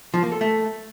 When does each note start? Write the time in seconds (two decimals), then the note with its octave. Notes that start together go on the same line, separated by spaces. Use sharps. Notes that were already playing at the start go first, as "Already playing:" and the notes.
0.14 F3
0.23 A#3
0.32 A4
0.41 A3